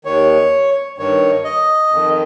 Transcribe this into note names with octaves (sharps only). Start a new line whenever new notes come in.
D#2 D#3 C#5
G2 D#3 C#5
D#5
F2 D#3